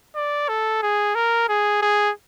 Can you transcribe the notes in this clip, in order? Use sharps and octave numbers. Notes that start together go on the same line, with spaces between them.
D5
A4
G#4
A#4
G#4
G#4